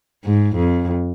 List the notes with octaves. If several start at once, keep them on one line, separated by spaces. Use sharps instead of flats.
G#2
F2